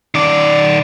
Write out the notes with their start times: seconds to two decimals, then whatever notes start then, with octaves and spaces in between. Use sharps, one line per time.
0.15 D#3 D5